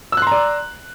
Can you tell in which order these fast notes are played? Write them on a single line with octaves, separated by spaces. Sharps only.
E6 F#6 C6 A#5 D5